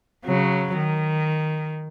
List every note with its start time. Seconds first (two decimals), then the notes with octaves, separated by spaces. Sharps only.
0.25 C#3 F#3
0.77 D#3